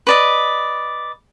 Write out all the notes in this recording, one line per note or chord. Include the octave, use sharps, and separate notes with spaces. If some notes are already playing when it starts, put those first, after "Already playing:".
B4 D5 D#5